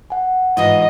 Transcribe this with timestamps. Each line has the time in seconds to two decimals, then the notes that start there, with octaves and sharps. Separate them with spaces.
0.10 F#5 G#5
0.57 G#2 E3 F4 D#5